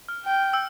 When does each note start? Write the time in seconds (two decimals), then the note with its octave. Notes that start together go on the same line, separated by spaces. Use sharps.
0.09 F6
0.25 G5
0.53 E6